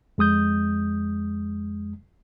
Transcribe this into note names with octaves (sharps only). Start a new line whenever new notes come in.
F2 G#3 D#6 G6